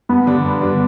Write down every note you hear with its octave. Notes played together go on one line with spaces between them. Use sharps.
G2 B3
D3 G3 D4
G2
D3 G3 D4